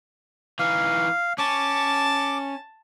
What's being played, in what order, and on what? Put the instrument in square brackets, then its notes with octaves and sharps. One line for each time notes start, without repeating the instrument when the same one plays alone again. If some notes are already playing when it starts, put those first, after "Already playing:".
[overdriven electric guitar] E3 D#4 [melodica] F5
[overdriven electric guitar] C#4 [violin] A5 [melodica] D6